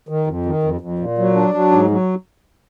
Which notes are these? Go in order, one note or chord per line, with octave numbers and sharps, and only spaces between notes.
D#3
F2
D#3
F2
F2
A#2
F#3
D4
F#3
G#2
F#3